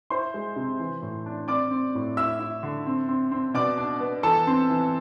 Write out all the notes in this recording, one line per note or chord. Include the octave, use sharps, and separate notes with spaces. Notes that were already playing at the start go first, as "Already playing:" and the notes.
E4 C5 C6
G#3
C3
E3
A2
D4
C4 D5 D6
C4
A2
E4 E5 E6
E4
D3
C4
C4
C4
B2 D5 D6
D4
B3
E3 A4 A5
C4
E3